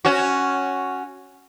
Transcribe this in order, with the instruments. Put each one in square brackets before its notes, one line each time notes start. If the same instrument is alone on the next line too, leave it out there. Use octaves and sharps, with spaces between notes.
[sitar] C#4 F#4